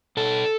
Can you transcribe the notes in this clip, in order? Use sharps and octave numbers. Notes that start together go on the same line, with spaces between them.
B2 A4